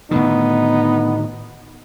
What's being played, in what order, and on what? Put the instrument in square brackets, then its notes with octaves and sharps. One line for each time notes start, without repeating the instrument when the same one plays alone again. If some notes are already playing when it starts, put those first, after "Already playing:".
[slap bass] A2 D3 D#3 [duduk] B3 [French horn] D#4